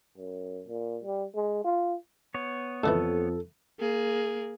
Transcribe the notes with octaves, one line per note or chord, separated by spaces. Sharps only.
F#2
A#2
G3
G#3
F4
B3 C#5
F2 G#2 C#3 E3 A4
A#3 G#4